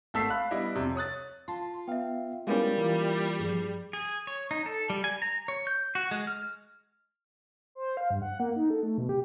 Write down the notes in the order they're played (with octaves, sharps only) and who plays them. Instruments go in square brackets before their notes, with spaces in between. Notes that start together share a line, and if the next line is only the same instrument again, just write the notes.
[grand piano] G#1 A3 A5 E6 B6 C7
F5 B5 F#6
G3 B3 D4 E4 D#5 E5
F2 C3
C#5 D#6 F#6 A6
[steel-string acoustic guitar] F4 [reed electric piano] A5 C6
[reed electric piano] B3 F5 [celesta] E5 G5
[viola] G3 [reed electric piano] G#3 B3 C#4 [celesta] E4 A#4 F5
[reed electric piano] E3 A#3 F4 [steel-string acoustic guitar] E5
[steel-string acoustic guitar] G2 F3 [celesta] G#4
[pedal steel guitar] G#4
C#5
D#4
A4
G3
G#5
A#5
C#5
G6
F#4
G#3
F6
[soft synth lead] C5
F5
G2
F#5
A#3
D#4
A4
A3
B2
G4